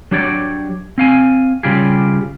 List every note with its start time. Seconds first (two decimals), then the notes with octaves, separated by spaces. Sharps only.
0.11 F#3 D4 G4 C#5 D5
0.98 C4 F5 G#5
1.63 C#3 G3 F4 G4 G#4